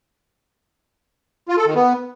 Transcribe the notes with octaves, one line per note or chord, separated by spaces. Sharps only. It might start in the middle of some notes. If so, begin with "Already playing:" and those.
F4
A4
D#3
B3